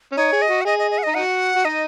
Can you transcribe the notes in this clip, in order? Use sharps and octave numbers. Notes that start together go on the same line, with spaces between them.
C#4
D#4 C#5
G#4
D#5
F#4
F#5
G#4 D#5
D#5
D#5
F#5
D#4 D#5
D#4 F#4 F#5
F#4
D#4 D#5